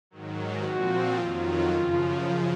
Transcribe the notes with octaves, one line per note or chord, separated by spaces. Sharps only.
G#2 D#3 F#3
A#2 F3 C4 F#4
F2 D#3 F#3 F4
F#2 C#3 F3